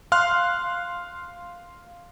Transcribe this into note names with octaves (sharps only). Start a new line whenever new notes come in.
F5 C6 F6 F#6